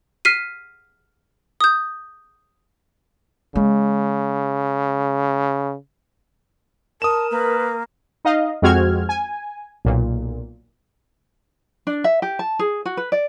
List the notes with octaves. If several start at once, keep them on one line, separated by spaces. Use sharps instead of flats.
F6 B6 C7 D#7
D#6 G6
C#3 G#3
A#4 A5 D#6 E7
A#3 B4
D#4 D#5 F5
F2 G#3 C4 F#4 F6 G#6
G#5
B1 A#2
D4
E5
G4
A5
G#4
F#4
B4
D5